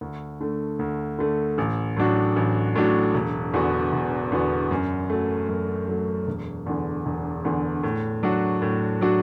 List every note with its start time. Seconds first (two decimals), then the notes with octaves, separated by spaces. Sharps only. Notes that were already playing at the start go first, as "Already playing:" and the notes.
0.01 D2
0.41 D3 A3
0.79 D2
1.19 D3 A3
1.58 A1
1.97 A2 F#3 D4 F#4
2.36 A1
2.75 A2 F#3 D4 F#4
3.14 E1
3.54 E2 D3 B3 F#4
3.93 E1
4.32 E2 D3 B3 F#4
4.71 F#2
5.10 F#3 A3
5.49 F#2
5.88 F#3 A3
6.27 E1
6.66 E2 D3
7.06 E1
7.45 E2 D3
7.83 A2
8.23 F#3 D4 F#4
8.62 A2
9.01 F#3 D4 F#4